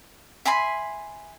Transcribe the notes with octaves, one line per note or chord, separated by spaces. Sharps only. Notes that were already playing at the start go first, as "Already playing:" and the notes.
E5 G#5 B5 C6